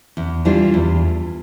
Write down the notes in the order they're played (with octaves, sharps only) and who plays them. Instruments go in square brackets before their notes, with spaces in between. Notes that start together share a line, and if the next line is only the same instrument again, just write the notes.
[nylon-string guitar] E2
E3 G3 D4 F4
E2